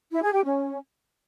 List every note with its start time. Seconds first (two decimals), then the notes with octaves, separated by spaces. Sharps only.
0.11 E4
0.22 G#4
0.33 G4
0.43 C#4